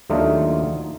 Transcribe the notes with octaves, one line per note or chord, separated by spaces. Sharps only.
D#2 F#3 A3 D4 D#4 F4